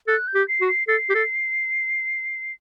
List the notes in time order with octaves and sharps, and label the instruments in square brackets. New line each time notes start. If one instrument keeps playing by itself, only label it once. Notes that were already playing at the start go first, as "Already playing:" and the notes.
[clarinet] A4 [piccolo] F#6
[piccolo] G6
[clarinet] G4
[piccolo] C7
[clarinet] F#4
[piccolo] C7
[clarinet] A4 [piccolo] C7
[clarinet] G4
A4